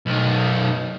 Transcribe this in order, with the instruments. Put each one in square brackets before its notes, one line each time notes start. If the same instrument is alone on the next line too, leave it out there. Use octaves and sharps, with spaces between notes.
[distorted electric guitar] B1 D#3